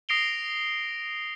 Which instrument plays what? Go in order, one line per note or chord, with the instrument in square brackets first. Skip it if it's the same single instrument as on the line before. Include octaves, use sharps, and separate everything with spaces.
[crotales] D#6 A#6 C7 D7 F7 G7